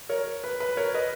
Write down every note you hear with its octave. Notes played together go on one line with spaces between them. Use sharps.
A#4 C#5
B4
B4
A#4 C#5
B4 D#5